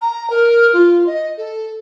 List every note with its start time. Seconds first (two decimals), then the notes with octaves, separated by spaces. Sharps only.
0.01 A#5
0.30 A#4
0.73 F4
1.06 D#5
1.37 A4